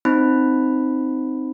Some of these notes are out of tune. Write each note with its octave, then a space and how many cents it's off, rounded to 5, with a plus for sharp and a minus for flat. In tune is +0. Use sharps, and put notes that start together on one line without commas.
C4 +0 D#4 +0 B5 +5